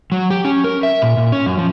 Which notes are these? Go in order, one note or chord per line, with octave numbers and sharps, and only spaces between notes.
F#3
G4
C#4
A#4
E5
A#2
A#2
C#4
F#2
F3